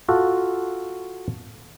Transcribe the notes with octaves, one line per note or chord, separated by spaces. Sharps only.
F4 F#4 A4